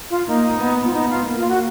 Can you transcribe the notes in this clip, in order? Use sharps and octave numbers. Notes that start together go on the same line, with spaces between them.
F4
A#3 D#4
B3
F4
B3 D#4
F4
A#3
F4
F#4